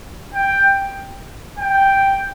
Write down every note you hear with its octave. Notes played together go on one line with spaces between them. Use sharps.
G5
G5